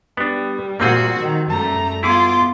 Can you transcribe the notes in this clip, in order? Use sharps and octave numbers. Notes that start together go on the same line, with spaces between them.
G3 B3 D4
A#2 A#3 C4 F#4 G#4
D#3
F#2 G3 A3 A#5
B3 E4 F4 G#4 C6 D6